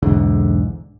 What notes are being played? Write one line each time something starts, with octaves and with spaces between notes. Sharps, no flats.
B1 E2 G#2 D3